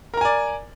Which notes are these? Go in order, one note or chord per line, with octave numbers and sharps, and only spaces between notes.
A#4 D5 G#5 A#5